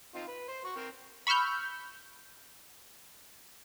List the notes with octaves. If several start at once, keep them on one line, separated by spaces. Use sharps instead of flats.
C4 D#4 F4
B4
C5
F#4 F#5 C#6
C4 A#4
B5 C#6 E6 F6 G6